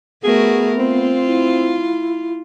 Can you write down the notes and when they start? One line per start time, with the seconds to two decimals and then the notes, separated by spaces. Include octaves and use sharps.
0.24 A3 B3 F#4 G#4 A#4
0.79 C4 F4
1.26 E4